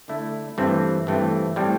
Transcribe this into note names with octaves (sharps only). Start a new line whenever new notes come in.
D3 A3 E4
G2 E3 A3 C4
G2 E3 A3 C4
A2 G3 C4